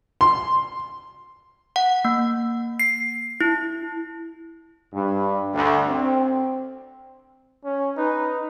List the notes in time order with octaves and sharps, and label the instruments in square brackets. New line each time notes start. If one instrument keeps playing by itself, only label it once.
[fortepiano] C6
[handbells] F#5
A#3
C7
E4
[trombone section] G2
D2
C4
[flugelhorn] C#4
[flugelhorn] D#4 [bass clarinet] B4